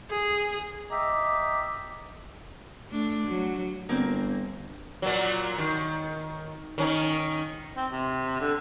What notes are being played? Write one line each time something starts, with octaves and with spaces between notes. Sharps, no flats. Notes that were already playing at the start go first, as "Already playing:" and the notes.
G#4
D#5 E5 G5 A#5 D6
A3 D4
F#3
G1 A#3 C4
A#2 F#3
D#3
D#3 C#4 D#4
C4
C3
D3